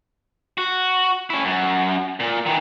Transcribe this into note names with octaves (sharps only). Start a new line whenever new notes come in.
F#4
C#4 E4
F#2
A#2
D#3 E3